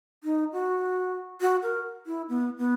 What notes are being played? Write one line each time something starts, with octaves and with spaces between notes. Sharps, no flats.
D#4
F#4
F#4
A#4
E4
B3
B3